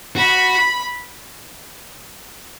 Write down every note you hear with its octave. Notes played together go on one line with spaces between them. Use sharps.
F#4 B5